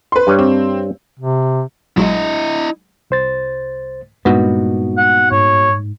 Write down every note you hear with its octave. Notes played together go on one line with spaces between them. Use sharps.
B4 C6
G2 G3 C#5
C4
C3
A#1 F#3 G#3 E4 D#5
C2 C5 A6
G2 A#2 G#3 B3 D#4 F#4
F#5
G#2 C#5